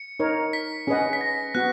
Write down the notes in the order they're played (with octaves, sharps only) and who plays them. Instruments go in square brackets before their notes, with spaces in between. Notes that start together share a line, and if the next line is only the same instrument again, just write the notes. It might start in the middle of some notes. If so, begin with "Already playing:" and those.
Already playing: [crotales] C#7
[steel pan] D#4 A#4 C#5
[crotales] B6
[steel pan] C#4 G#4 B4 D#5 F#5
[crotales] B6
A#6
[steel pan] B3 F#4 [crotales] F#6